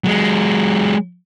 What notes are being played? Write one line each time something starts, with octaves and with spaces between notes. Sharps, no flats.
F#3 G#3